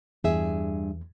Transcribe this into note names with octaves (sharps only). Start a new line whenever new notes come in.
E2 G2 G#4 E5